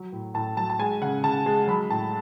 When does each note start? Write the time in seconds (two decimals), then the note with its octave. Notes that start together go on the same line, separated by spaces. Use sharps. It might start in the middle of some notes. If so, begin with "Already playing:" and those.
Already playing: F#3
0.12 A2
0.34 A2 A5
0.57 F#3 A5
0.70 A5
0.79 G#3 G#5
1.01 C#3 F#5
1.24 C#3 A5
1.46 G#3
1.67 F#3 B5
1.90 A2 A5